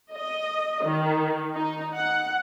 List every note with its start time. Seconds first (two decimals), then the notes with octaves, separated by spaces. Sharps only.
0.14 D#5
0.84 D#3
1.55 D#4
1.94 F#5